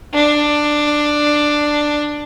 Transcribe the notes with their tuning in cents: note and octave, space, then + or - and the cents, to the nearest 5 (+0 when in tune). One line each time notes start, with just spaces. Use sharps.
D4 +10